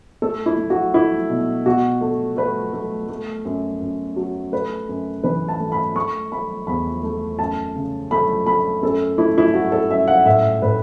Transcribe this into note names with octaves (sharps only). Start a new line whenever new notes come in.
A3 A4
E4
A3
F#4
A3 E4
B2
B2 F#4
A3
A3 B4
A3
A3
F#2
F#2
F#3
A3 B4
F#2
E3 B4
A5
A3
B5
A3 C#6
A3 B5
E2 B5
A3
F#2 A5
C#3
A3 B5
A3 B5
F#2 A4
A3 E4
E4
A3 F#4
A4
F#2 E5
F#5
A2 E5
A2 B4